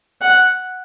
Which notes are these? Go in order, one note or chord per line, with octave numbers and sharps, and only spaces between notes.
F#5